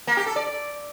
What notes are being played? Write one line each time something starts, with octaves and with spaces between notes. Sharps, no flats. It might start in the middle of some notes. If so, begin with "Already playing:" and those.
A#3
G4
A4
D5